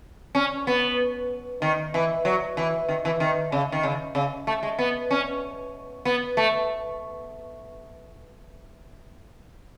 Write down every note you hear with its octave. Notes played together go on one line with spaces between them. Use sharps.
C#4
B3
D#3
E3
F#3
E3
D#3
E3
D#3
C#3
D#3
C#3
C#3
A3
G#3
B3
C#4
B3
A3